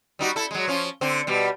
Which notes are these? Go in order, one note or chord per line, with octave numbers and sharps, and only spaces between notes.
G3 D#4 F#4
E4 A4
F#3 G#3
F3 C#4 F4
D3 C4
B2 G3